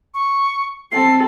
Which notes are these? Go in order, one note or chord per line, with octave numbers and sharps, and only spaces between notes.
C#6
C4 A4 C7